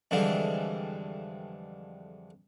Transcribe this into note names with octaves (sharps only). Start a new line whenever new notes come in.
F2 D3 E3 G3 G#3